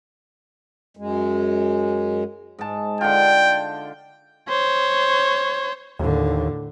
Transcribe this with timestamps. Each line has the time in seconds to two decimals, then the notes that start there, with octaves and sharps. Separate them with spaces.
0.97 F#2 G#3
2.59 G#2 A5
3.01 D3 F4 G5
4.49 C5 C#5
5.99 D#2 A2 D3